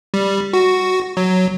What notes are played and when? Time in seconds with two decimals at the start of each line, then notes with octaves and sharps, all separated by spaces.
0.14 G3
0.53 F#4
1.17 F#3